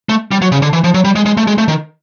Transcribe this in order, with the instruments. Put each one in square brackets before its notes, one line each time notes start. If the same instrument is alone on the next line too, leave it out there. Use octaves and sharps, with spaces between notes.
[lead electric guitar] A3
G3
F#3
C#3
D3
E3
F3
F#3
G3
G#3
G#3
A3
G#3
A3
D#3